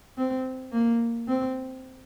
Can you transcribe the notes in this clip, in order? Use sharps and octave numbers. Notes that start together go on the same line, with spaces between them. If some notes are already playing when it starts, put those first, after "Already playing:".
C4
A#3
C4